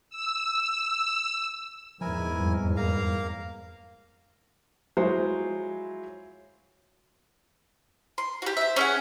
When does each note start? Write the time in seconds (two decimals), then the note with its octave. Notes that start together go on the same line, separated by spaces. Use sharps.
0.10 E6
2.01 E2 G#2 F3 E4 A#4 G#5
2.39 F2 G3
2.77 A#3 F5 A#5
4.97 F3 F#3 G#3 E4 C5
8.18 C6
8.42 F#4 G4
8.57 C5 E5
8.76 C#4 G#4 F#5